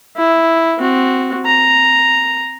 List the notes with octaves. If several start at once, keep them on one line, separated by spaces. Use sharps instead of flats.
E4
C4 F#4
A#5